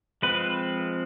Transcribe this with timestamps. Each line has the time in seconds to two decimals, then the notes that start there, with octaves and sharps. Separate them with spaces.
0.22 F3 G#3 C4 B4